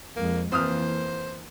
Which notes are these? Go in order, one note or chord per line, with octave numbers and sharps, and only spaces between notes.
F2 G#3 A#3
F2 E3 A#3 C5 D#6 F6